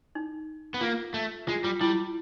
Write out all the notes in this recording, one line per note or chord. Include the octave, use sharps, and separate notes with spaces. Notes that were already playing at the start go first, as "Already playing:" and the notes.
D#4
B3
A#3 F4
A3
G#3 F4
G3 F4
G3 E4